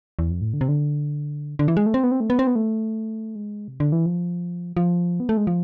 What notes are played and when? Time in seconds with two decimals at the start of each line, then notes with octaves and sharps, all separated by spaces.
0.19 E2
0.31 F2
0.41 A2
0.53 D3
0.61 C3
0.68 D3
1.59 D3
1.68 E3
1.77 G#3
1.86 A3
1.94 C4
2.04 B3
2.12 C4
2.20 A3
2.30 B3
2.39 C4
2.47 B3
2.56 A3
3.35 G#3
3.68 C3
3.80 D3
3.92 E3
4.06 F3
4.77 F3
5.20 B3
5.29 A3
5.37 G#3
5.47 F3